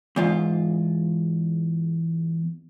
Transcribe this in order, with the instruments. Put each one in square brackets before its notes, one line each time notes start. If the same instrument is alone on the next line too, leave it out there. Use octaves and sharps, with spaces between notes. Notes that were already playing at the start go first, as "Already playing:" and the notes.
[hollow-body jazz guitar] E2 G#2 F4